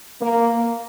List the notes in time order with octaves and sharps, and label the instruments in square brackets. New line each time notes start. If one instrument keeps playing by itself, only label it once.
[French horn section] A#3